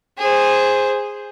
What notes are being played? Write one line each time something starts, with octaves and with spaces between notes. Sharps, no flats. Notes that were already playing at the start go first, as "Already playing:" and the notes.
G#4 C5